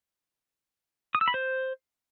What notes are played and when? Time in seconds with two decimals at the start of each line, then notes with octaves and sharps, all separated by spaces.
1.15 D#6
1.21 E6
1.28 B5
1.34 C5